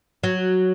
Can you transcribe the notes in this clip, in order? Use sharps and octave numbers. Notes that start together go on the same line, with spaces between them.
F#3